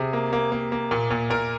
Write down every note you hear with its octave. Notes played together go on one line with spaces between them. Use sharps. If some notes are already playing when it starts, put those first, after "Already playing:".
Already playing: C3 G#4
A#3
A#3
A#3
A#3
A#2
A#2
A#2 A#4